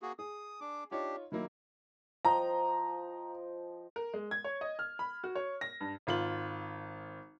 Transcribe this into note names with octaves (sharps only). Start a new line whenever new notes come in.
A#3 F#4 G#4
G#4 D#6
D4 D6
D4 D#4 F4 G4 C#5
D#3 F#3 A#3 E4
F3 D#5 G5 A#5
A#4
G#3
G#6
C#5
D#5
F6
B5
F#4
C#5
A#6
G2
G#1 F4 F#7